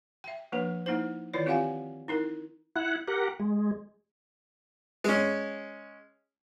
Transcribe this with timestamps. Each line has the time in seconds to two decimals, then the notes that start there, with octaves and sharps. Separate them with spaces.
0.24 E5 G5
0.52 F3 A#3 D4 B4
0.86 A#3 D#4 E4 C5
1.34 D#3 E3 E4 F4 C#5 D5
1.46 C4 F4 G4 F5 F#5 G#5
2.08 D#4 E4 A#4
2.76 E4 F#5
3.08 G4 A#4 F#5
3.39 G#3
5.04 G#3 C#4